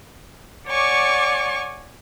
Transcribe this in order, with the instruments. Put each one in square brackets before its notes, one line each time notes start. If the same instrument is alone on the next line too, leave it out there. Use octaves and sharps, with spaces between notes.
[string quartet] C#5 D5 F#5 G#5 C#6 D6